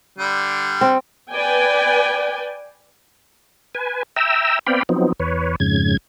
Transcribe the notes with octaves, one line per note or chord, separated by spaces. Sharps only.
D3 G3
C4
B4 D5 G5 G#5
B4 G#5
E5 G5 A#5 E6
B3 C4 D5 F5 G5 B5
F3 F#3 B3 C4 D#4
E2 B4 C#5
F2 G#2 C#3 G#6